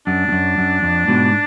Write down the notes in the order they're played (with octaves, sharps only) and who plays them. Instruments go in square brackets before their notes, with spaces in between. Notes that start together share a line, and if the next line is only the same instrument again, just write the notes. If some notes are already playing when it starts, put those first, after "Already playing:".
[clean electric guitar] F#2 [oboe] D4
[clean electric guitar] F2
F#2
F#2
F2
G#2 B2